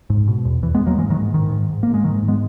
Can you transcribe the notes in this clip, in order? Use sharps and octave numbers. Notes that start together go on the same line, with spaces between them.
G#2
B2
E2
E2 E3
G#3 B3
E2
F#3 A#3
G#2 E3 G#3
D#3 F#3
G#2
G#2 D#3
G#2
G#2
G#2 A#3
G#3
G#2 D#3 F#3
G#2
G#3 B3